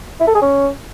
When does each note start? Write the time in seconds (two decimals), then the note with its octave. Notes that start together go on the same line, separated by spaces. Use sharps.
0.20 E4
0.27 A4
0.35 G#4
0.42 C#4